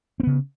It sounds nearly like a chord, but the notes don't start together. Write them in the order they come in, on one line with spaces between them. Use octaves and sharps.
C4 B3 C#3